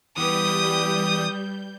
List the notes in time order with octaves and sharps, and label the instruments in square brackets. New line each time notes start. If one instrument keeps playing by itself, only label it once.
[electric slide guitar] E3 B3 [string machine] G3 G6 [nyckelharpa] G4 B4 [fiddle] D#6